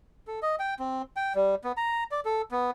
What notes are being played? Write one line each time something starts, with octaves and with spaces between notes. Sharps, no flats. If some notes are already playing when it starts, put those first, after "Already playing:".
A4
D#5
G5
C4
G5
G3
B3
A#5
D5
A4
B3